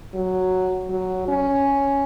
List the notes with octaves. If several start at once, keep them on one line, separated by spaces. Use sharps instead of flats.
F#3
F#3
C#4